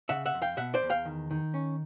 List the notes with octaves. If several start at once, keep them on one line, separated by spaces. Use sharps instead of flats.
C#3 E5 F#5
E5 F#5
F2
F5 G5
B2 E5 F#5
C5 D5
E2
F5 G5
D#3
D#3
C#4